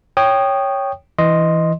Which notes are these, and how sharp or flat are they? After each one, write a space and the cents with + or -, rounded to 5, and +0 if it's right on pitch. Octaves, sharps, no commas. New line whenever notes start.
C#5 +0 G5 +0 D#6 -20
E3 +0 D#5 +0 C6 +0